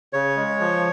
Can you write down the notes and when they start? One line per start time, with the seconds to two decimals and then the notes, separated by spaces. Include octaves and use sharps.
0.13 C#3 C#5
0.37 G#3
0.60 F3